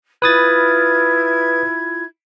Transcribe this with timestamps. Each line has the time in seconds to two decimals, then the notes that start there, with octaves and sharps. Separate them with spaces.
0.22 E4 F4 B4 D#6 G#6 A6